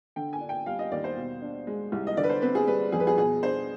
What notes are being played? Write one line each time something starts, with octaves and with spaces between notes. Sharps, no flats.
D3 G5
G#5
D4
G5
G3 F5
D#5
D#2 D5
C5
B2
D4
G#3
C2
D#5
D3 D5
B4
C5
C4 B4
G#4
G3 B4
F2 G#4
B4
G#4
B2 G#4
D4 C5